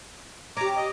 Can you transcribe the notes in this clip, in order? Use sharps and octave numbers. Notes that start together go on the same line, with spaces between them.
C#4 G4 A#5 D6
D#5